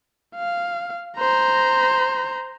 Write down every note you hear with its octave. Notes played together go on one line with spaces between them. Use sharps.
F5
C5 A#5